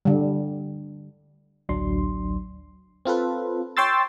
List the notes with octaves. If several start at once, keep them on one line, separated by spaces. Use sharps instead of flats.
D3 G3
A1 D2 F#3 D4 C6
C4 F4 A4 B4
C#5 G5 C6 E6 A6